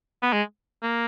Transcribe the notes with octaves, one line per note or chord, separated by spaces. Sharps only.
B3
G#3
A#3